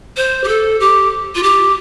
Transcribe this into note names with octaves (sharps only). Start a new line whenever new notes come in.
C5
G4
A4
G4
F4
G4